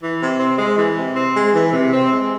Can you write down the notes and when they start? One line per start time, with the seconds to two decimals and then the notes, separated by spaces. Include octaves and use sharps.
0.01 E3
0.20 C3
0.39 C4
0.58 G#3
0.78 E3
0.96 C3
1.16 C4
1.34 G#3
1.53 E3
1.73 C3
1.92 C4
2.11 G#3